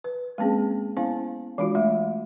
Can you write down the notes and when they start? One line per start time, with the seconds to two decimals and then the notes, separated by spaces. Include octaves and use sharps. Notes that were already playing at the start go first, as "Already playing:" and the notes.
0.04 B4
0.38 G#3 A#3 C4 C#4 G#4
0.97 B3 C#4 E4 C5 F5
1.58 E3 G#3 D4 F4 F#4
1.75 A3 E5